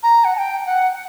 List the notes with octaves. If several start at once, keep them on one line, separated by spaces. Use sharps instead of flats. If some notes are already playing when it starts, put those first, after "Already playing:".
A#5
F#5
A5
G5
F#5